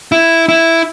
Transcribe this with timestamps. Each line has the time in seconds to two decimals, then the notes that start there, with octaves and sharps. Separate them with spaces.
0.12 E4
0.49 E4